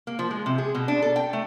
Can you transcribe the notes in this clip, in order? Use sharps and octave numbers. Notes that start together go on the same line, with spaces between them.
A#3
F3
G#3
C3
G#4
B2
D4
A4
G5
A3